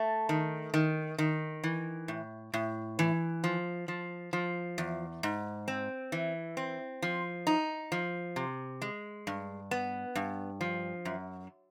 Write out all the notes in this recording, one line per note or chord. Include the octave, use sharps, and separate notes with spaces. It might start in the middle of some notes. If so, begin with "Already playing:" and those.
Already playing: A3
D#3
D#3
D#3
E3
A2
A2
E3
F3
F3
F3
E2
G#2
C4
E3
C4
F3
D#4
F3
C3
G#3
G2
B3
G2
F3
F#2